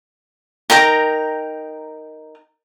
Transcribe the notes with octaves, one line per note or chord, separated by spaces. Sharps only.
D#4 A#4 G5 A#5